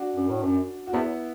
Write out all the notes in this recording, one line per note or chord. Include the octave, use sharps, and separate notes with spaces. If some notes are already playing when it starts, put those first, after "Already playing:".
Already playing: D4 F#4
F#2
A2
F#2
F#4
E2 B3 E4